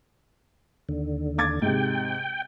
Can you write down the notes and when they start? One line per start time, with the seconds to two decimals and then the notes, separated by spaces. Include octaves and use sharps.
0.89 D#2 D3
1.38 D6 G#6 A6
1.62 G#2 C3 G5